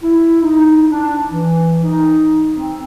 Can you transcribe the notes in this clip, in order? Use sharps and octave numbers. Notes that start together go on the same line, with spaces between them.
E4
D#4
D4
E3
D#4
C4